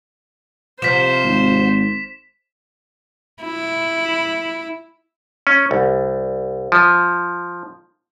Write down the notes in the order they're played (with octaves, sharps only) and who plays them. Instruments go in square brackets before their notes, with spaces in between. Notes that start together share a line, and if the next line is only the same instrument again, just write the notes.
[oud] C3 F3 [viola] C5 [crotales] B6 E7
[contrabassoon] G#1
[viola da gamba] E4
[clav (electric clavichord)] C#4
C2
F3